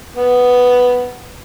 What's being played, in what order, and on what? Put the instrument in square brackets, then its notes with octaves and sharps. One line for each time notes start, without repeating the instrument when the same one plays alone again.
[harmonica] B3